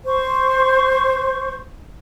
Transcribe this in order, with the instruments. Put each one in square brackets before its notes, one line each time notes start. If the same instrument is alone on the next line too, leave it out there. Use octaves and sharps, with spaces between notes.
[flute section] C5 C#6